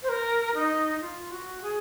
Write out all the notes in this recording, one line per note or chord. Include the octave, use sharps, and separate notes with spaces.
C5
A#4
D#4
F4
F#4
G#4